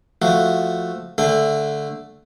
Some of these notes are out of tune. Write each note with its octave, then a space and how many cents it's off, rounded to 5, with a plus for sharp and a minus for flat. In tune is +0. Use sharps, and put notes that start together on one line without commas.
F3 +0 A3 +0 F#4 +0
D3 +0 A3 +0 G5 +40